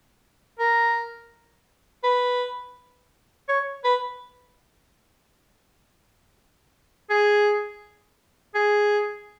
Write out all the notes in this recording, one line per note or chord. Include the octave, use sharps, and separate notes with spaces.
A#4
B4
C#5
B4
G#4
G#4